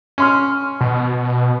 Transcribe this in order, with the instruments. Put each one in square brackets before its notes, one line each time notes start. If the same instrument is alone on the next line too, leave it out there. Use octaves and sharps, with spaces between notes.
[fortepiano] C#4 C6 F6
[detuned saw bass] B2